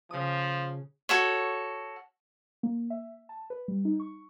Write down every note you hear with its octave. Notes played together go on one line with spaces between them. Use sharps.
C#3 F3 D#6
F#4 A4 C#5
A#3
E5
A5
B4
G3
D#4
C#6